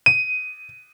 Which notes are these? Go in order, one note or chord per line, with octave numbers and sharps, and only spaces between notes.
D#7